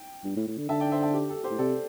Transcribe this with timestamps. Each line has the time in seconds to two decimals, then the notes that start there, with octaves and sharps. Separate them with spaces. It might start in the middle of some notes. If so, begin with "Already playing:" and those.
Already playing: G5
0.24 G2
0.36 A2
0.47 A2
0.57 D3
0.69 D3 E5 A5
0.80 D5 G5
0.92 C5 E5
1.03 E5 A5
1.14 G4
1.30 A4
1.44 G4 C5
1.50 A2
1.58 C3 A4 D5